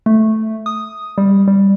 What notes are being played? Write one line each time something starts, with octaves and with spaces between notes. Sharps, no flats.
A3
D#6
G3
G3